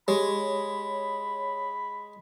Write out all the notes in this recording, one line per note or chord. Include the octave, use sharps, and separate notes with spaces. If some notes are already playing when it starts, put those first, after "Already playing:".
G#3 G4 C#5 B5